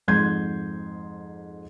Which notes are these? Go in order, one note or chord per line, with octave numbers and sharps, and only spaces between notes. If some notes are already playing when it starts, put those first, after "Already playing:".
F2 G#2 C6 G6 G#6